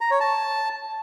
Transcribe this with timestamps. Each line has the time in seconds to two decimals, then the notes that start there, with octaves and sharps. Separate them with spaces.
0.01 A#5
0.11 C#5
0.20 A5